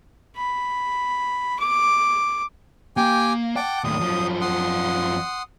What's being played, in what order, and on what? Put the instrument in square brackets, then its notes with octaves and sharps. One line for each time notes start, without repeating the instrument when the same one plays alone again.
[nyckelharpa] B5
D6
[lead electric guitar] A#3 [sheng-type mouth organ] G4 G5 G#5
[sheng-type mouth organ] F#5 A5 D6 [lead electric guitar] G5
[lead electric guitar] D#2 A2 [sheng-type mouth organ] D#6
[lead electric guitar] F#2 F3
[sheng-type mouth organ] F#5 C6 D#6